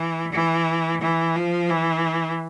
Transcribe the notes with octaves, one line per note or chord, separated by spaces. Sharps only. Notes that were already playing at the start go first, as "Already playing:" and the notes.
Already playing: E3
E3
E3
F3
E3